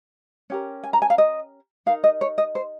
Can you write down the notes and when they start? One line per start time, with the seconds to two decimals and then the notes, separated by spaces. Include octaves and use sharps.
0.50 C#4 G4 A#4
0.84 G#5
0.93 A#5
1.02 G#5
1.10 F5
1.18 D#5
1.86 D#4 A#4 F5
2.04 D#5
2.21 C#5
2.38 D#5
2.55 C5